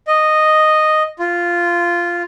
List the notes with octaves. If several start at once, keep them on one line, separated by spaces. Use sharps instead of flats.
D#5
F4